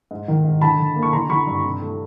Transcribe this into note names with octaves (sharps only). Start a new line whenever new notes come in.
G#2
D#3
G#2
D3 A5 B5
D3
A#3
C#6
D3 A#5 C6
D3 B5 C#6
G2
C3
A3